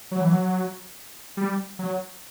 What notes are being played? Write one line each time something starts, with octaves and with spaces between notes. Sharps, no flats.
F#3
E3
F#3
G3
F#3